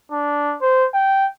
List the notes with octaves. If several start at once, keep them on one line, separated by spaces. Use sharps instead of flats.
D4
C5
G5